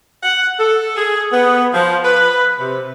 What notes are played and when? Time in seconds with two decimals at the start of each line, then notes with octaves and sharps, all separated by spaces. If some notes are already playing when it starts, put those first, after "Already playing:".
0.23 F#5
0.59 A4
0.96 G#4
1.32 B3
1.74 F3
2.05 B4
2.60 C3